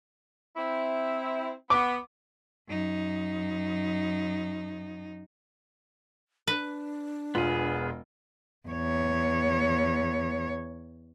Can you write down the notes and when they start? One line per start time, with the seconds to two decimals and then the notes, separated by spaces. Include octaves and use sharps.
0.57 C4 E4
1.70 B3 D6
2.68 F#2 D#4
6.47 D4 B4
7.35 E1 B3 F4 G#4
8.68 E2 C#5